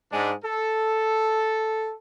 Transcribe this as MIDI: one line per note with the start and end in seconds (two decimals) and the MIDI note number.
0.12 0.32 44
0.12 0.32 56
0.12 0.32 62
0.44 1.92 69